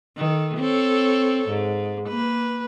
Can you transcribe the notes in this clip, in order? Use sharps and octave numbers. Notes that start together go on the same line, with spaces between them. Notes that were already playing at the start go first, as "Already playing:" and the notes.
D#3 A4
C4 A4 C#5
G#2
A#3 B4